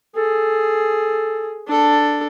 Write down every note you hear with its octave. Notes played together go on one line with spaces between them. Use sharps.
G#4 A4
D4 A4